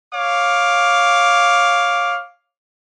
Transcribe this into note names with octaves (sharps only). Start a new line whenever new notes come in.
C#5 F5 D6